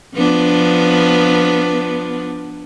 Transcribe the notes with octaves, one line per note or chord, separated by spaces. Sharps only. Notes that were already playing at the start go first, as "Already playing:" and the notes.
F3 B3 D4